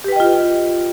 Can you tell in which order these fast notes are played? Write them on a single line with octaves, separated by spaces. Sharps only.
G4 B4 G5 D#5 F4